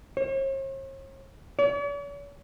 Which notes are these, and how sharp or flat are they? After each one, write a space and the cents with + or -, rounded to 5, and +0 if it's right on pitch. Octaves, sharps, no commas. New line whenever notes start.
C#5 -45
C#5 +45